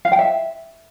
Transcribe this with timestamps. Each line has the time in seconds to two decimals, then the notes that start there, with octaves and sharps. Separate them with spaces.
0.05 F5
0.12 G5
0.19 E5